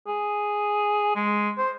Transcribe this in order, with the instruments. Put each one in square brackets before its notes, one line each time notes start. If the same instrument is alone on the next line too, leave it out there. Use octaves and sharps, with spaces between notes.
[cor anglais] G#4
G#3
C5